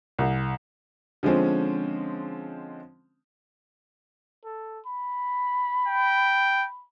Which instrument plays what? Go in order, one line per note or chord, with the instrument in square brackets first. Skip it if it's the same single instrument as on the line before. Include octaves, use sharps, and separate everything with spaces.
[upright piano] C2
D3 F3 G#3 C4 C#4
[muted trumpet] A4
B5
[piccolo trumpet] G5